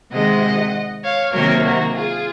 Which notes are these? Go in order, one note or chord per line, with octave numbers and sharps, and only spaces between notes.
C3 D#3 G#3 D#5 F#5
C#5 F5
C3 D#3 F#3 A#3 A#4 C#5
F#4 A#4
F4 G#4